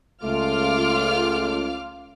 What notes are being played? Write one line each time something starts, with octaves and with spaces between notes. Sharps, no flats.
C#2 A3 F4 D6 F6